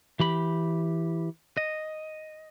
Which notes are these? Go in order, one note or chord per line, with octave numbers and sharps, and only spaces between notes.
E3 G4 B5
D#5